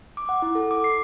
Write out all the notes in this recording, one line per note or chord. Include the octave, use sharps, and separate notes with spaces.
D6
F#5
E4
A4
D6
C7